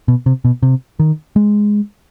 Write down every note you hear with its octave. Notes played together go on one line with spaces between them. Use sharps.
B2
C3
B2
C3
D#3
G#3